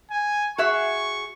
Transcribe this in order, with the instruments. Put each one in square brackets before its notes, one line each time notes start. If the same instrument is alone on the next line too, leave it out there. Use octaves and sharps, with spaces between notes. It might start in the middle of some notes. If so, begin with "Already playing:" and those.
[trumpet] G#5
[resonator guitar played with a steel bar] F#4 G#4 E5 [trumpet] C#6